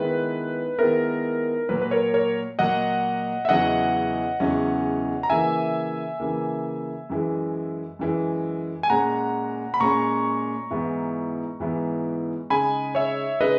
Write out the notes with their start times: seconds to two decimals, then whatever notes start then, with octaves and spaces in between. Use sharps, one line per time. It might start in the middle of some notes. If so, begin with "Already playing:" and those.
Already playing: D#3 G#3 B3 E4 B4
0.79 D#3 G#3 B3 E4 A#4
1.69 A#2 F#3 A#3 B4
1.82 B4
1.91 A#4 C#5
2.14 A#4 C#5
2.59 A#2 F#3 A#3 D#5 F#5
3.45 E5
3.49 E2 C#3 F#3 C#4 E4 D#5 F#5
4.40 E2 C#3 F#3 C#4 E4
5.23 A#5
5.30 C#3 E3 A#3 E5 G#5
6.20 C#3 E3 A#3
7.10 F#2 E3 G#3
7.99 F#2 E3 G#3
8.83 G#5
8.90 A#2 G#3 C#4 F#5 A#5
9.74 B5
9.80 A#2 G#3 C#4 A#5 C#6
10.71 G#2 E3 B3 E4
11.60 G#2 E3 B3 E4
12.50 C#3 G#3 D#4 G#5 B5
12.95 C#5 E5
13.41 C#3 G#3 D#4 B4 D#5